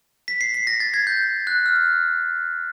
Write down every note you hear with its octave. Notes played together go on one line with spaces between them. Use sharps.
B6
C7
C7
A#6
A6
G#6
G6
F#6
F6